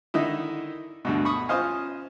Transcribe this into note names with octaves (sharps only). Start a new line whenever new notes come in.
D3 D#3 D#4 E4
D2 G2 B2
B5 C#6 D#6
C#4 F4 C5 D#5 F5 G#5